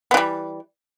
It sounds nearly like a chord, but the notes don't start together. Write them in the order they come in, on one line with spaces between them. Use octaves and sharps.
B3 E3 G3